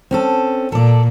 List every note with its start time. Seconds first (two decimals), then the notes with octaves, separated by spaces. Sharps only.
0.11 C4 C#4 A4
0.72 A#2 A4 D5